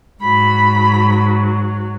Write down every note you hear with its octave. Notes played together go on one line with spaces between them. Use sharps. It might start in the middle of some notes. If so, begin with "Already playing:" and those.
G#2 F#3 B5